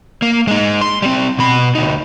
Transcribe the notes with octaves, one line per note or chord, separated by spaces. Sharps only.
A#3
G#3 D#4
C6
G3 C4
B2 B5
D2 D#4